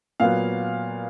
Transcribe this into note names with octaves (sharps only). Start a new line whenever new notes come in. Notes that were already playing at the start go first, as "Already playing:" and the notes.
A#2 F#3 B3 F5